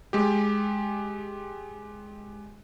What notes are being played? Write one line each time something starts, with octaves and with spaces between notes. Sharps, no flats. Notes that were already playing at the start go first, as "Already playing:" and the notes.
G#3 G4